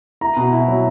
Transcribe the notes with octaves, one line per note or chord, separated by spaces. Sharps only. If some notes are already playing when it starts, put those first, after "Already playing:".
E4 A#5
B2
E4
F#3